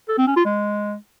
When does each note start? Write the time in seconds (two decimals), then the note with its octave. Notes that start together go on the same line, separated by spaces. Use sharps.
0.09 A4
0.18 C4
0.27 C#4
0.36 F4
0.45 G#3